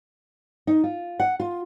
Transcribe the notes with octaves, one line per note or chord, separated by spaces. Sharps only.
D#4
F4
F#5
F4